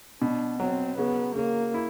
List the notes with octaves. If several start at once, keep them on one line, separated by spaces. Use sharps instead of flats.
B2 D4
F#3 C4
C#3 B3
C#3 A#3
E4